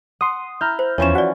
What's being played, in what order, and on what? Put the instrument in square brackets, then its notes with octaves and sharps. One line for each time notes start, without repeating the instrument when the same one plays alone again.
[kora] F#5 [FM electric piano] C6 D#6
[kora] E4 [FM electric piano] A#5 F6 G6
[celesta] C5
[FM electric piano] E2 [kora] E3 F3 C#4 [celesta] C#5 E7
[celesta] F#4 D5 [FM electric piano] F#5